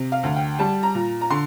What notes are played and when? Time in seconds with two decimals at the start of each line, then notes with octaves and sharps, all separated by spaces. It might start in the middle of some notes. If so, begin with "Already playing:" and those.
Already playing: C3
0.12 F5
0.23 D2
0.36 G5
0.59 G3 A5
0.83 A#5
0.95 A#2
1.21 A#5
1.30 D3 C6